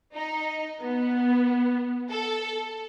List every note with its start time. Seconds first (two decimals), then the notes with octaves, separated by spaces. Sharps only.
0.15 D#4
0.80 B3
2.10 A4